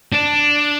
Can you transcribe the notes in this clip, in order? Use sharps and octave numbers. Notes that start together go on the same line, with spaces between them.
D4